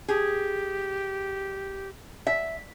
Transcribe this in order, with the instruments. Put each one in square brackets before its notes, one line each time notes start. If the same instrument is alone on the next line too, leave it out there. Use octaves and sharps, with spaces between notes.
[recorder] G4 [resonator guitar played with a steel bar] G#4
[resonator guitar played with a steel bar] E5